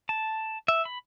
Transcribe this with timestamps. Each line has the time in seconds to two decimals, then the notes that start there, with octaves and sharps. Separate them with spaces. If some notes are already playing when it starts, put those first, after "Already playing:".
0.09 A5
0.68 E5
0.85 B5